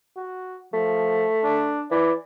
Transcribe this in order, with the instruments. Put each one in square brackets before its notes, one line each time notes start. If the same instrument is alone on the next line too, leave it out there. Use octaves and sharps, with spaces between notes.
[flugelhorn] F#4
[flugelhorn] F3 [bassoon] A3
[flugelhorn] D4
[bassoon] E3 [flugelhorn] D5